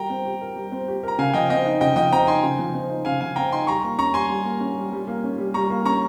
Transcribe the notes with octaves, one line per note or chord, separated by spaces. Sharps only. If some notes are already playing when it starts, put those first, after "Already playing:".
Already playing: G3 G4 A#4 G5 A#5
C4
G4
A#4
G3
C4
G4
A#4 A#5
C#3 F5 G#5
F3 D#5 G5
C4 D#5 G5
D#4
C#3 D#5 G5
F3 D#5 G5
C4 G5 A#5
D#4 G#5 C6
C#3
F3
C4
D#4
C#3 F5 G#5
F3 F5 G#5
C4 G5 A#5
D#4 G#5 C6
G3 A#5 C#6
A#3
C#4 A#5 C#6
G3 G#5 C6
G3
A#3
C#4
G3
G3
A#3
C#4
G3
G3 A#5 C#6
A#3
C#4 A#5 C#6